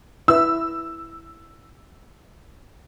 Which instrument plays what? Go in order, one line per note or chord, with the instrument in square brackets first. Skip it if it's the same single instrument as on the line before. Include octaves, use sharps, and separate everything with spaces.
[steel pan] E4 B4 E5 [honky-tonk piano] E6